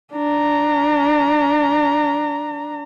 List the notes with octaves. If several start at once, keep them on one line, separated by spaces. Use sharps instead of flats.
D4 A#5